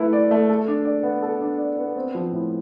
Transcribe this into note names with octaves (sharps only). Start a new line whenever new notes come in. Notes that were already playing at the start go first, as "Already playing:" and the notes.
Already playing: A3 E4 B4
D5
A3
A4
D4
D5
B3
A4
D4
D5
B3
C4
F3
A2